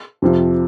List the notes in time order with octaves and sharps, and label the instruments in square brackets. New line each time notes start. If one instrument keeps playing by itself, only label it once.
[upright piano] F2 C3 F3